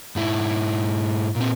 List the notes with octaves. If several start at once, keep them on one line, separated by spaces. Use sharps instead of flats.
G#2 E4
A#2 C4